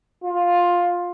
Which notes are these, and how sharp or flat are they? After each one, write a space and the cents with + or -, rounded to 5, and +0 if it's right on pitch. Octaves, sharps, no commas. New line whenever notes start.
F4 +10